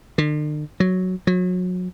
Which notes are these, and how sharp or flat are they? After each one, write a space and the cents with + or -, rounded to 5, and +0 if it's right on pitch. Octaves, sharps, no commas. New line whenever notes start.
D3 +45
F#3 +0
F#3 -30